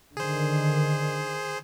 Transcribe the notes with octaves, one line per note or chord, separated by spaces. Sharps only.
D3 D#3 G#4 C5